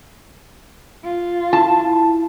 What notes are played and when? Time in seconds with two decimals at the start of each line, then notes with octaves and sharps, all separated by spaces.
1.04 F4
1.53 E4 A5